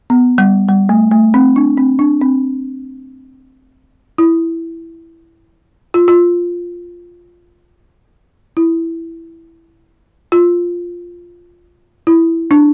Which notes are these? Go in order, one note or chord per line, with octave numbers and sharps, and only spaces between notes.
B3
G3
G3
A3
A3
C4
D4
C4
D4
C4
E4
F4
F4
E4
F4
E4
D4